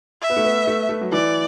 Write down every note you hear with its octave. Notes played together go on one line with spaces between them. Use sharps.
E5
B3
A3
B3
A3
A3
F#3
E3 D5